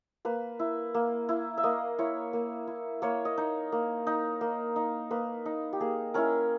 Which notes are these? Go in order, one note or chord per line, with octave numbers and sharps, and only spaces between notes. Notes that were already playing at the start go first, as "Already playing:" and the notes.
A#3 B4
E4
A#3
E4
E5
A#3 D#5
E4 C#5
A#3
E4
A#3 C#5
D#5
D#4
A#3
D#4
A#3
D#4
A#3 B4
D#4
G4
A#3 G#4
C#4 E4 A#4